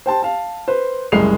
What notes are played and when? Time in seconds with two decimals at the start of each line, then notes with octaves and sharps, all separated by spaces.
0.06 C5 G5 A5 C6
0.22 F5 A5
0.68 B4 C5
1.12 F#1 C2 G#3 C7 F7